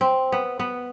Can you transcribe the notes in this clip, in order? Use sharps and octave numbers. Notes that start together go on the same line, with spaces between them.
C4
B3
B3